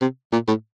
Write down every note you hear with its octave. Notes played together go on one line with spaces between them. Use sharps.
C3
A#2
A2